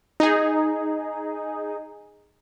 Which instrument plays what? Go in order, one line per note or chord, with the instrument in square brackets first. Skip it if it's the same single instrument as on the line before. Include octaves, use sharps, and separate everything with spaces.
[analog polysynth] D#4 G#4